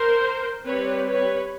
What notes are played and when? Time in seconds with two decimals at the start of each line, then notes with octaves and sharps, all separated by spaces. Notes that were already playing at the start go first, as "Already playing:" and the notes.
Already playing: A#4 C5
0.66 G3 C4 B4 C#5
1.08 B4 C#5